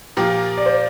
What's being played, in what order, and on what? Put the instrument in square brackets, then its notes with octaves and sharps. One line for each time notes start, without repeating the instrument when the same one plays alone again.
[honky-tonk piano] A#2 F3 A#3 F4 [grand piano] G4
[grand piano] D5
C5